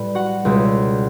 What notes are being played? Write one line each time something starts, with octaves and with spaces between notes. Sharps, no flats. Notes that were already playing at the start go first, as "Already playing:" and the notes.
Already playing: A2 G3 B4 B5
F#4 F#5
C#2 B2 G3